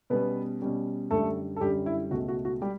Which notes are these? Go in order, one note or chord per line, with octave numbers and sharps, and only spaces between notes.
B2 G3 B3 C#4 B4
B2 G3 C#4
F#2 D3 G3 A3 A4
A4
F#2 D3 G3 G4
E4
C#2 B2 A3 F#4
F#4
F#4
G3 G4